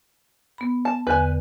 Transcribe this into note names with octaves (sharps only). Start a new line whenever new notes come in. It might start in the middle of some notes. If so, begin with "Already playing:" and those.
B3 B5
A5
E2 D3 B4 G#5